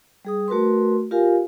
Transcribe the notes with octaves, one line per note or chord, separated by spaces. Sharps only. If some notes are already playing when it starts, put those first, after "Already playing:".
G3 G#4 D#6
A3 F#4 A#4 B4 C6
F4 G4 A#4 F5 G#5